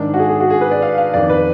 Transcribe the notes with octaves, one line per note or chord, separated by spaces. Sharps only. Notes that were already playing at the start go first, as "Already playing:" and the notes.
Already playing: G#2 D#3 D4
F#4
G#4
G#4
F#4
G#4
B4
D5
F5
F5
F2 D#3 D5
B4